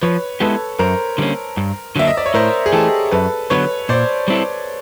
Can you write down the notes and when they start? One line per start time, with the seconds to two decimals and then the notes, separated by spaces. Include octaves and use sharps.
0.02 F3 B4 C#5
0.40 G#3 B3 E4 G4 A4 B4
0.79 F#2 A#4 C5
1.18 D3 G3 A#3 C#4
1.57 G2
1.96 D3 F#3 A#3 D4 E5
2.08 D#5
2.17 D5
2.26 C#5
2.34 A2 A#4 C5
2.66 G#4
2.73 E3 A3 G4 A4
3.11 F#2 A4 B4
3.50 D3 F#3 B3 B4 C#5
3.89 A#2 C5 D5
4.28 G3 C4 E4 A4